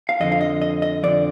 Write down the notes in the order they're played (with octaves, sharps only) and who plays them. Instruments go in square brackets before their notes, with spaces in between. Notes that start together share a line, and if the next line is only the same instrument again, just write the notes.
[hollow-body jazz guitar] F5
F2 D3 F3 D#5
F5
D#5
D#5
D#5
F2 D3 F3 D5